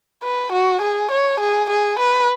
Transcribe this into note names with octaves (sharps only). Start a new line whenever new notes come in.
B4
F#4
G#4
C#5
G#4
G#4
B4